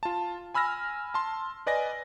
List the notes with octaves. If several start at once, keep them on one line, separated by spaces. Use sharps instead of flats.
F4 A5
G#5 B5 E6 F6 A#6
A5 C6
B4 D5 D#5 G#5 A#6